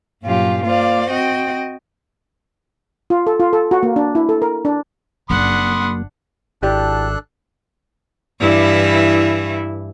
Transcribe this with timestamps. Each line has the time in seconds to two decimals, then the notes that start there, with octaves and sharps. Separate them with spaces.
0.22 G2 A#2 F#3 C#4 F4 G4
0.63 A#3 F4 C5 D5 F5
1.10 C4 F#4 D#5 G5
3.10 F4
3.27 A4
3.40 F4
3.53 A4
3.71 F#4
3.83 A#3
3.96 D4
4.15 E4
4.29 A4
4.42 A#4
4.65 D4
5.30 F#1 F#3 A#3 D4 F#5 B5 C6 D#6
6.63 G#1 D4 E4 G4 A4 D5 F#6
8.40 G2 E3 E4